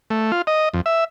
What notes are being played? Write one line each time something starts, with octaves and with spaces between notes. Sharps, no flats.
A3
F4
D#5
F2
E5